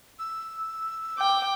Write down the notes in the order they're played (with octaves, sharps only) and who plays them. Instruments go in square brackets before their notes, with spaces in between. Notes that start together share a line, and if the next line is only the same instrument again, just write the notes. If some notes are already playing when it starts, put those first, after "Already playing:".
[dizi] E6
[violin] G5 D6